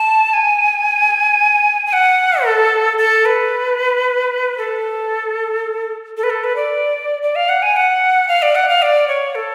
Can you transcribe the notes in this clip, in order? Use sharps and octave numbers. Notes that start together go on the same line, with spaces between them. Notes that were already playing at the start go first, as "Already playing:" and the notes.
Already playing: A5
G#5
G#5
F#5
A4
A4
B4
A4
A4
B4
A4
B4
D5
D5
F5
F#5
G#5
F#5
F5
D5
F#5
F5
D5
C#5
A4